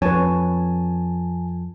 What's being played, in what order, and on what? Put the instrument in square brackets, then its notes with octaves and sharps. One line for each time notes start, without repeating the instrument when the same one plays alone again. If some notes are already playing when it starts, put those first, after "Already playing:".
[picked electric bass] F2 [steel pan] B4 C#5 [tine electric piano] G#5 A5